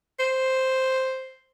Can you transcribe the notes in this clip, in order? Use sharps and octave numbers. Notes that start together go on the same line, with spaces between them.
C5